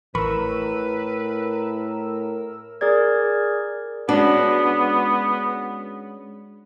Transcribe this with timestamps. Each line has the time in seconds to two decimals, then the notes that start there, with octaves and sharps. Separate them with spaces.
0.15 A1 A2 A#4 B4 B5 C#6 E6
2.81 G#4 A#4 D5 G#6
4.09 G#3 B3 C#4 D4 F#4